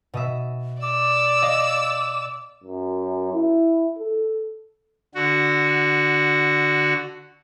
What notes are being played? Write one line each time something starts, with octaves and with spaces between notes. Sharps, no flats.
B2 D#5 E5
D5 D6 E6
D#5 F5
F#2
E4
A4
D3 F#4